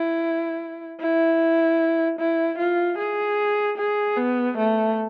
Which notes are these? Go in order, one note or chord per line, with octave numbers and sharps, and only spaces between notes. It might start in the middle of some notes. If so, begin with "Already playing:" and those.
Already playing: E4
E4
E4
F4
G#4
G#4
B3
A3